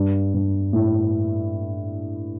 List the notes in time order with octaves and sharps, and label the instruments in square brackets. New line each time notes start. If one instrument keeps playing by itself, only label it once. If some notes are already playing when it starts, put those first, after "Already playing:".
Already playing: [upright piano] G2
G2
A2